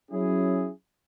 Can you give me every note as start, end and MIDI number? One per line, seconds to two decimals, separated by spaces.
0.11 0.69 54
0.11 0.69 61
0.11 0.69 64
0.11 0.69 68